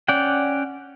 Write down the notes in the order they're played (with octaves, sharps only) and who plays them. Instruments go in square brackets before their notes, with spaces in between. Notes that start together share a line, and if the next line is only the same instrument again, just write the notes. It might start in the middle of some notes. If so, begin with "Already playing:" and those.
[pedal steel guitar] C#4 D5 F#5 G5